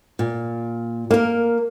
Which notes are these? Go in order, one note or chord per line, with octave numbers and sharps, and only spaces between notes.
A#2
A#3 A#4